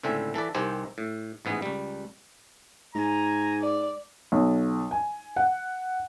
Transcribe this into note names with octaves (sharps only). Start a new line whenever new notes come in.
C#2 A2 D3 C4 E5 G#5
E3 A4 B4 D5
C2 D#3 C4 G4 C5 G#5
A2
A1 G#2 B3 G#4
C#2 G3
G#2 G#5 A#5
D5
B1
G#5
F#5